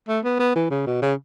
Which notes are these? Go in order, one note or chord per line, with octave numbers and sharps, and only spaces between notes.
A3
B3
B3
E3
C#3
B2
C#3